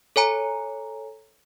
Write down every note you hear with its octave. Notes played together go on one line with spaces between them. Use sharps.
A4 C#5 G#5 A#5